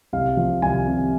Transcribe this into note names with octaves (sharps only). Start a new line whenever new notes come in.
C2 F5
F3
C2 G#5
C3